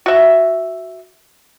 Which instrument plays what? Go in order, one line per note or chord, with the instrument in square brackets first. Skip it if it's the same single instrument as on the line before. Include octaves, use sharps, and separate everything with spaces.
[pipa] F#4 E5